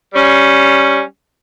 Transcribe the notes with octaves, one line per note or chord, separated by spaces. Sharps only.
G3 C#4